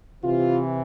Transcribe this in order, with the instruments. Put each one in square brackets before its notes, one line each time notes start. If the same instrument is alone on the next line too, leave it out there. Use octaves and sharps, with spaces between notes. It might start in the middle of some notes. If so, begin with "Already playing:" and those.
[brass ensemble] C3 E3 F4